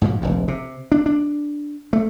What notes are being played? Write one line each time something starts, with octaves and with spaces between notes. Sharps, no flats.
G#2 B2 E3 F3
F1 A#1 D#2
C3
D4
D4
A3